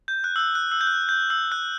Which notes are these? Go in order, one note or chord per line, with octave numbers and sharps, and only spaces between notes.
G6
F#6
E6
F#6
F#6
E6
G6
F#6
G6
E6
F#6